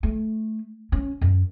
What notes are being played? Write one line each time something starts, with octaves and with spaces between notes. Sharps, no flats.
A3
C#4
F#2